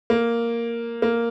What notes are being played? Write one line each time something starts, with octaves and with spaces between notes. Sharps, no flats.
A#3
A#3